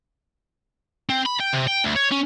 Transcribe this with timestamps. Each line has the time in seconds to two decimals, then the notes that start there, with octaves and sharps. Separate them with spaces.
1.09 C4
1.26 B5
1.40 G5
1.53 C3
1.67 G5
1.84 D2
1.96 C#5
2.12 C#4